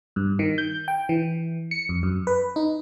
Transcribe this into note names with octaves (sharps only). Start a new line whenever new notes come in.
G2
D#3
G6
G5
E3
C#7
F2
F#2
B4
D#4